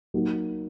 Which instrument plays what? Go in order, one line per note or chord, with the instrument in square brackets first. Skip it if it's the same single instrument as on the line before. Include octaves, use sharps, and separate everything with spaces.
[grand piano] F#3 A#3 D#4 F#4